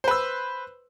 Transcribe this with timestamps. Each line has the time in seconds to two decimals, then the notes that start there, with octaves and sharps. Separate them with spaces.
0.04 C5
0.08 B4
0.11 E6